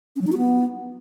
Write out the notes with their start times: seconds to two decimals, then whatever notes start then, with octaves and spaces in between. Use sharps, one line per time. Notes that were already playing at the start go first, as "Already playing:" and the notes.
0.16 C#4
0.21 F#3
0.27 D#4
0.32 F#4
0.38 B3